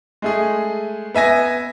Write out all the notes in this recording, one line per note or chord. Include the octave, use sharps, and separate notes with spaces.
G#3 A3 G#4
B3 E5 G#5 A#6